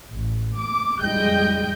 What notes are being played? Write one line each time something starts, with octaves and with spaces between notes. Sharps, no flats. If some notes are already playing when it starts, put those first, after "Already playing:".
A1
D6
F2 G3 G#3 D#5 G5 G6